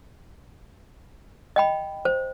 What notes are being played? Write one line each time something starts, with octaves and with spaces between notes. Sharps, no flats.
D#5 G5 B5
C5